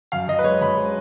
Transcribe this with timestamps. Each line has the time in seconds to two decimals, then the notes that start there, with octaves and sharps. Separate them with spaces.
0.12 F#2 F5
0.28 F#2 D#5
0.39 B4
0.44 G#3 C#5
0.61 F#2 B5
0.77 G#3